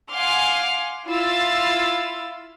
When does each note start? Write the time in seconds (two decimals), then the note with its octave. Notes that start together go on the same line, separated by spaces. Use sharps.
0.11 F5 F#5 G#5 C6 D6 F6
1.07 E4 F4 F5 E6 A6